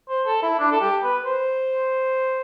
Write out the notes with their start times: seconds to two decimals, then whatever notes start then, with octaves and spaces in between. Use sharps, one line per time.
0.09 C5
0.26 A4
0.43 E4
0.59 D4
0.72 A4
0.81 G4
1.03 B4
1.26 C5